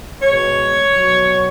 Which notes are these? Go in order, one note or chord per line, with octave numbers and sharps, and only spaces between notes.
B2 G#3 C#5
B2 F#3